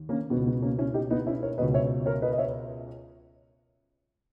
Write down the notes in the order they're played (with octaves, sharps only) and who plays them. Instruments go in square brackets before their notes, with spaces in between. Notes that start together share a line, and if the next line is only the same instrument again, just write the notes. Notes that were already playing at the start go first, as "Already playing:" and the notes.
Already playing: [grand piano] D#2
A#3 C#4
B2 B3
C#2
B3
A#3 C#4
C#4 E4
D#4 G4
B3 D#4
C#4 E4
A#4 C#5
C#2 B2 B4 D#5
C#5 E5
A#4 C#5
B4 D#5
D#5
C#5 E5